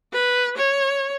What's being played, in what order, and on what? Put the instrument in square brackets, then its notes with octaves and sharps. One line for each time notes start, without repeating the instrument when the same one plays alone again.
[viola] B4
C#5